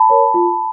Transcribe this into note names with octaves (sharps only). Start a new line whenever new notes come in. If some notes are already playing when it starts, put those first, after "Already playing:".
Already playing: A5 B5
A#4 C#5
F4